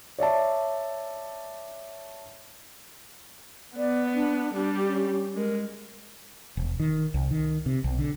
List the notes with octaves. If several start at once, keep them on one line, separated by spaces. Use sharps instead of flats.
C#5 D5 E5 A5
B3 D5
D4
G3 D4 G4
C#4
G#3 A#4
E1
D#3
C2
D#3
C3
B1
D3